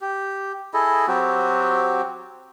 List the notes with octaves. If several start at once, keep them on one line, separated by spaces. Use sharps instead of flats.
G4
E4 G#4 A4 D#5
F#3 C4 F#4 G4